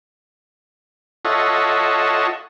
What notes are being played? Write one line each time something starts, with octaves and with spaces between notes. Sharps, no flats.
F4 A4 C#5 D#5 E5 F#5